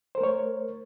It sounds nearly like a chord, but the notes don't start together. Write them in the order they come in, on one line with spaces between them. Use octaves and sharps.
C5 A#4 A3 C#5